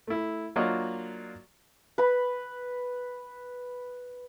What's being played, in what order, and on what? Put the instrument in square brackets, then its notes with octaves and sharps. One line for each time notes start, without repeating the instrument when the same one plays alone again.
[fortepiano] A3 E4
F#3 A#3 D4 F4 F#4 D#5
[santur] B4 B5